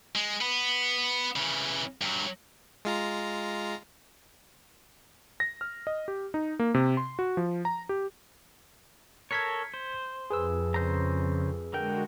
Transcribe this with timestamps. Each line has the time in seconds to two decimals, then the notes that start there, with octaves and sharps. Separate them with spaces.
0.16 G#3
0.41 B3
1.36 C#3 E3
2.02 G2 F#3
2.85 G#3 F4 A#5
5.40 A#6
5.61 F6
5.87 D#5
6.08 G4
6.34 D#4
6.59 A#3
6.74 C3
6.97 C6
7.19 F#4
7.37 F3
7.65 A#5
7.89 G4
9.31 A4 A#4 C#5 G#6 B6 C#7
9.74 C5
10.30 F2 G#4 B4 E6
10.74 C#3 C5 A#5
11.73 D3 G#3 F#4 A#4 G5